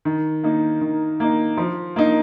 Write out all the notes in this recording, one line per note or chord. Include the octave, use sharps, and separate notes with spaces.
D#3
A#3 D#4
D#3
A#3 D#4
F3
A#3 D#4